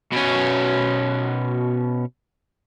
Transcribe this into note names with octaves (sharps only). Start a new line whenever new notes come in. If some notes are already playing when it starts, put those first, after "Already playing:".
B2 C#4